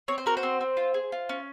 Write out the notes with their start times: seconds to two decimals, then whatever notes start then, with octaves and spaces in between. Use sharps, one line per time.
0.08 C4 C#5
0.18 C5
0.26 F#4 A#4
0.37 C5
0.43 C4
0.61 C4
0.77 F4
0.94 G#4
1.12 F4
1.29 C#4